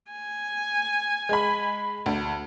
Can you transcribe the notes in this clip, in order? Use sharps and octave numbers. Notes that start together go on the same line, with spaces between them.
G#5
G#3 B5
D2